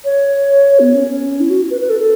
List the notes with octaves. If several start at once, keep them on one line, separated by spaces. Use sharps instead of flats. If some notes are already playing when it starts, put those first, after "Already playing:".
C#5
B3
C#4
E4
F#4
B4
B4
A4
A4